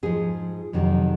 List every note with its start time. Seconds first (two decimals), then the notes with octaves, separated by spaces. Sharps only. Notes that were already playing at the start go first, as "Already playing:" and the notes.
0.03 G#2 F3 G#4
0.73 F2 C3 D#3 F#3